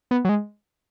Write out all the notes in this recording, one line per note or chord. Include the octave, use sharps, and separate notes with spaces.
B3
F#3
G#3